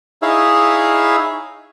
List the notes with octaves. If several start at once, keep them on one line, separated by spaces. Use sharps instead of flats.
D#4 E4 G#4 C#5 E5 F5